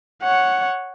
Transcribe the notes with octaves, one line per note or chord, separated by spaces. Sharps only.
C#5 F#5